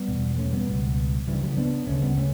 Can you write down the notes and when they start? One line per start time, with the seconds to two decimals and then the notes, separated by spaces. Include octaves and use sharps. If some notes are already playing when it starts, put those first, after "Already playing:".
Already playing: G3 B3
0.08 E2 B2
0.38 A3 C#4
0.53 G3 B3
0.68 C#2 B2
1.27 D2 C#3 E3 G3
1.43 F#3 A3
1.57 B3 D4
1.87 D2 C#3 A3 C#4
2.02 G3 B3
2.17 A3 C#4